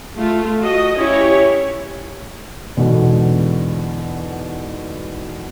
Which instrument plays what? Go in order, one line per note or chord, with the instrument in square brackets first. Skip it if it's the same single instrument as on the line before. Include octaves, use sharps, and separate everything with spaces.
[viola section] A3 F4
F#4 D#5
C#4 E4 G4 C#5
[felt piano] E2 G#2 B2 D3